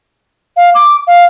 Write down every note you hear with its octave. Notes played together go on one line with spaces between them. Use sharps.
F5
D6
F5